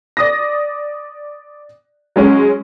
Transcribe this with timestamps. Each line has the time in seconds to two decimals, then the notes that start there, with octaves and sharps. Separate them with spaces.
0.17 D5 D#6 A#6
2.16 F#3 G#3 C#4